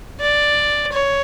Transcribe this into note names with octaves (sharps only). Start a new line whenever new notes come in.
D5
C#5